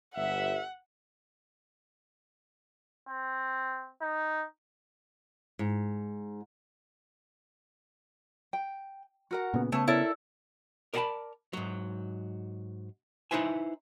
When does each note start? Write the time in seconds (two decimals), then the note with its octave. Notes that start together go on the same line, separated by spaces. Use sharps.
0.15 G1 E5 F#5
3.09 C4
4.02 D#4
5.59 G#2
8.53 G5
9.31 F#4 A#4 F#5
9.54 A#2 C#3 B3
9.72 C#3 A3 B3 C#5 A5
9.88 E4 A4 A#4 C#5 D5
10.94 A#4 D5 D#5 F#5 A5 B5
11.53 G#2 F#3
13.31 D#4 E4 B4 C5 E5 G#5